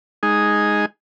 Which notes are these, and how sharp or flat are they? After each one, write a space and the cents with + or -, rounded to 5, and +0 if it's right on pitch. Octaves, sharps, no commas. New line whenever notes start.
G#3 +0 D#4 +0 G#4 +0